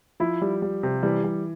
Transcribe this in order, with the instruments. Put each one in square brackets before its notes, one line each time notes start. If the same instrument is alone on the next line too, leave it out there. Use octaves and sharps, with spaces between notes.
[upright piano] F3 [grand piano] E4
[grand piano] G3
G3
C3
[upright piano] E3 [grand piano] G3
[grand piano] G3